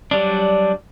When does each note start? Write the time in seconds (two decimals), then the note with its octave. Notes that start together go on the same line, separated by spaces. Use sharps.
0.11 F#3 G3 D4